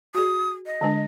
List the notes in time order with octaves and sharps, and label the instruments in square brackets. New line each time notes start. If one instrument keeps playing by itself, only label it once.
[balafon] F#4 G#4 [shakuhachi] D#6
[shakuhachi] D#5
[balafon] D3 G#3 D4